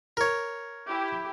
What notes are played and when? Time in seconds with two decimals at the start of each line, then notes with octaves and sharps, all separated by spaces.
0.17 A#4 C#5
0.87 E4 G4